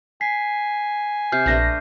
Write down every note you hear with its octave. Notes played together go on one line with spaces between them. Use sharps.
G#5 B6 C7
C3 F6 G6 C7
A#1 A3 D4 B4 A#6